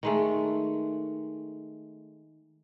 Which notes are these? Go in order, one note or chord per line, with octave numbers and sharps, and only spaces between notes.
D#3 G#3 A3